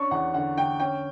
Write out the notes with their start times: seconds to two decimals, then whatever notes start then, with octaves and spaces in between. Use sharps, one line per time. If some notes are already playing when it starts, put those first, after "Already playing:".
Already playing: C#4 D4 C#6
0.11 E2 F#5
0.34 D3 F#5
0.57 D3 G5
0.80 C#4 G5